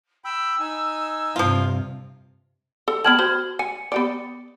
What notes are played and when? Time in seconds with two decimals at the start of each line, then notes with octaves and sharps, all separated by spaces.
0.24 G5 B5 E6
0.60 D#4 G#5
1.36 G2 C3 F3 F4
2.88 A4
3.04 B3 G5 A5 F6 G#6 F#7
3.19 F#4 C5
3.59 G#5 C#7
3.92 B3 G4 D5